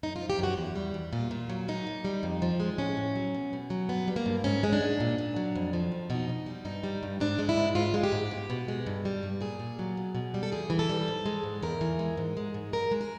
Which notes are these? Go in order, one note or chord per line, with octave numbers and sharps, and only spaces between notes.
F#2 D#4
F4
F3
G4
F#2 F#4
E2
G3
E2
A#2 F4
A#2
F#3
A#2 D#4
A#2
G3
F2
F3
G#3
A2 C#4
A2
F#3
B2
B2
F#3
G2 B3
G3
A#3
G2
G#2 C#4
G#3
D4
G#2
A#2
A#2
F#3
F2
F3
F2
B2 D#4
B2
G3
G2 D#4
G3
G2
G#2 D4
G#3
E4
G#2
G#2 F4
G#3
G4
G#2
B2
B2
G#3
G2
G3
G2
A#2 G#4
A#2
F#3
B2
B2
G3
A4
E2 G#4
E3
A4
G3
G#2
G#3
G#2
E2 A#4
E3
G#3
G#2
G#3
G#2
F#2 A#4
G#3
A#4